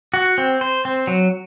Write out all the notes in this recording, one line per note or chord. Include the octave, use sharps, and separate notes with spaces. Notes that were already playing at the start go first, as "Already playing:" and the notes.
F#4
C4
C5
C4
F#3